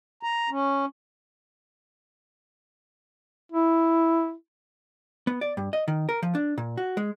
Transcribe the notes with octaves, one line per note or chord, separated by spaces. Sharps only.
A#5
C#4
E4
B3
D5
G2
D#5
D#3
A#4
F3
D4
A#2
F#4
G#3